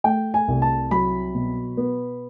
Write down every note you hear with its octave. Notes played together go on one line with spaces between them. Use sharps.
A3 G5
G#5
C2
A5
F#3 B5
B2
B3